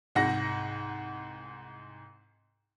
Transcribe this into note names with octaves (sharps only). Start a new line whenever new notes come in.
C2 G#2 F#5 A#6